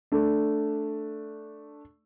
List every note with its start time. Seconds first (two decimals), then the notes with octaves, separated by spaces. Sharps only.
0.12 A3 D4